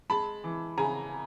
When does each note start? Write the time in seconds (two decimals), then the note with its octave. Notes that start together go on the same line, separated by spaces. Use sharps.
0.10 G#3 A5 B5
0.44 E3
0.78 C#3 G#5 A#5